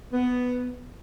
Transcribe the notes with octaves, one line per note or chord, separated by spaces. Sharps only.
B3